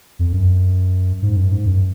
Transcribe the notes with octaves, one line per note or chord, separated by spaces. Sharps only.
F2
F#2
G#2
F#2
G#2
F#2